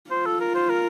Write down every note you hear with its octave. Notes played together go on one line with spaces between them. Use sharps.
F4 C5
A4
A#4
C5
A#4